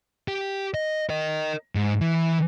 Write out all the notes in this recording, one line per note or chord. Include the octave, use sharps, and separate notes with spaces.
G4
D#5
A#4 D#5
G#2
E3